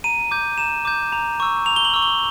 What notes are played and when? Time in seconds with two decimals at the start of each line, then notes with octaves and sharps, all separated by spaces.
0.04 A#5 D#7
0.31 D6 G6
0.58 A#5 E7
0.85 D6 G6
1.12 A#5
1.40 C#6 E6
1.66 A#5 F7
1.76 G7
1.85 F#7
1.94 C#6 E6
2.02 G7